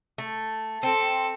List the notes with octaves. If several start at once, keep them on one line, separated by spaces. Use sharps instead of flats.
A3
C4 A4